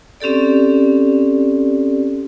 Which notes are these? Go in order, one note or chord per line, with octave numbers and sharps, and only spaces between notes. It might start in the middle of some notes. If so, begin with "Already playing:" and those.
C4 C#4 G4 A4 D5